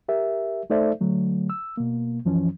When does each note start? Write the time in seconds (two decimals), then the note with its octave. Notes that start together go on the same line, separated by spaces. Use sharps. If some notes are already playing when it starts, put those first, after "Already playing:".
0.09 G4 A#4 E5
0.70 A3 D#4 A4 C5 D5 E5
1.01 D3 F#3 A3
1.50 E6
1.77 B2 A#3
2.25 F#2 E3 F3 C#4